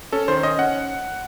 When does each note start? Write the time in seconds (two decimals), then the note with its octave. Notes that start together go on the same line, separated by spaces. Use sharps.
0.12 C#4 A4
0.28 D#3 C5
0.43 C#4 D#5
0.59 C#4 F#5